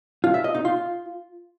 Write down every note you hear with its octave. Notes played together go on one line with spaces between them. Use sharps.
F4
E5
D#5
D#4
F4